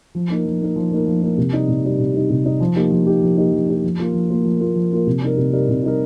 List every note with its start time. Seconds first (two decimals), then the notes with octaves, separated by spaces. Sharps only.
0.15 F3
0.30 A#3 D#4 A#4
0.45 F3
0.61 A#3 D#4 A#4
0.76 F3
0.92 A#3 D#4 A#4
1.07 F3
1.22 A#3 D#4 A#4
1.38 C3
1.53 G3 D#4
1.69 C3
1.84 G3 D#4
1.99 C3
2.14 G3 D#4
2.30 C3
2.45 G3 D#4
2.60 F3
2.76 A#3 D#4 G4
2.92 F3
3.07 A#3 D#4 G4
3.22 F3
3.38 A#3 D#4 G4
3.53 F3
3.68 A#3 D#4 G4
3.84 F3
3.99 A#3 F4 A#4
4.14 F3
4.30 A#3 F4 A#4
4.45 F3
4.61 A#3 F4 A#4
4.76 F3
4.91 A#3 F4 A#4
5.07 C3
5.22 G3 D#4 A#4
5.37 C3
5.53 G3 D#4 A#4
5.69 C3
5.84 G3 D#4 A#4